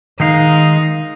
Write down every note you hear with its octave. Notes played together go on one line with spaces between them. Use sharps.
D#3 G#3 D#4 F5